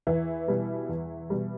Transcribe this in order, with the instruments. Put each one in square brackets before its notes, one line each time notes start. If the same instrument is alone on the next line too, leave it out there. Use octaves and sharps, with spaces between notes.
[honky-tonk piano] E2 E3 E4
B2 G3
E2
B2 G3